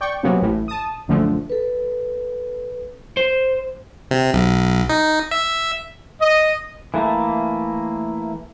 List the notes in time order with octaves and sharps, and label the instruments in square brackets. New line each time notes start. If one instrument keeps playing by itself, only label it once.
[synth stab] D5 G5 C#6
C3 F#3 A#3 B3 C#4
A1 A2
A5 D#6
A#1 F#2 D3 F3 A3
[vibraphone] A4 B4
[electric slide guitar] C5
[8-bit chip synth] C3
B1
D#4
E5
[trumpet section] D#5
[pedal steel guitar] E3 A3 A#3